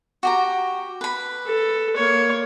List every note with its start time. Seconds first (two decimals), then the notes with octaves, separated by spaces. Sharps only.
0.23 F#4 G4 A#5
1.01 B4 B5
1.45 A4
1.96 A#3 C#5